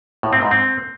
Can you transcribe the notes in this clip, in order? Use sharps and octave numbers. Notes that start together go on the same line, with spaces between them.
A2
C4
G#2
C4